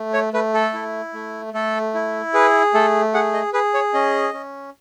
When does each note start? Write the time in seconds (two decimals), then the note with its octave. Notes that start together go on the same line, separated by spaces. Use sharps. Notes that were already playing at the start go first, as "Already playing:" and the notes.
Already playing: A3
0.13 C#5
0.33 A3 B4
0.54 A4
0.74 E4
1.13 A3
1.54 A3 A4
1.94 E4
2.34 G#4 B4
2.74 A3 A4
3.14 G#4 F#5
3.34 D#5
3.53 G#4 B4
3.74 C#5
3.94 C#4 D#5
4.33 C#4